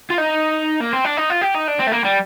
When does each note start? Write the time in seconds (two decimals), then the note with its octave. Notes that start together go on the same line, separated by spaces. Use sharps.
0.10 F4
0.18 D#4
0.81 A#3
0.93 C4
1.05 D4
1.17 D#4
1.30 F4
1.42 G4
1.54 D#4
1.68 D4
1.79 C4
1.87 A3
1.92 A#3
2.04 G3